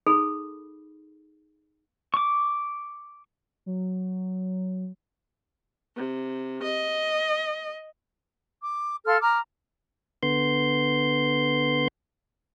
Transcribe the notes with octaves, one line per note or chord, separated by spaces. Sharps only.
D#4 G#4 A4 B5
C#6 D6
F#3
C3
D#5
D6
A4 F5 C6 F6
A#5 D6 F6
D3 B3 C6 G6